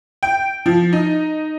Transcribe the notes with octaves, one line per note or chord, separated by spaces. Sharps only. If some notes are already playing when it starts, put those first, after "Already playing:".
G5
F3
D#4